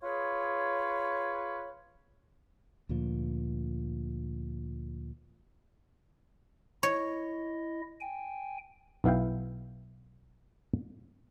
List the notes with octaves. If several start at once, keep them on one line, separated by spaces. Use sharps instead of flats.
F4 G#4 B4 C#5
D2 A#2 F3
E4 C#5 D#5
G5 G#5
B1 B3 E4 F5 G5